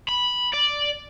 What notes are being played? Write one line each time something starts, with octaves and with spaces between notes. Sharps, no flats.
B5
D5